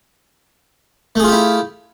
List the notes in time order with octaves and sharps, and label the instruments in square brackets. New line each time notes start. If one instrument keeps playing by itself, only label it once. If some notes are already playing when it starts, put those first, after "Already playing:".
[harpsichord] A3
G#4
F4
G4
E4